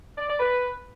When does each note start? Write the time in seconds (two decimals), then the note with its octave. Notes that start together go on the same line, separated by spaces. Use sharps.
0.17 D5
0.28 D5
0.39 B4